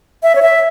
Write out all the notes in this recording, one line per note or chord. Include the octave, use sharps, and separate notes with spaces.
E5
C#5
E5